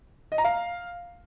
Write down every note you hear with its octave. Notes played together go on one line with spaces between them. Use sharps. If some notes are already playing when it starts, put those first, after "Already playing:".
D#5
A#5
F5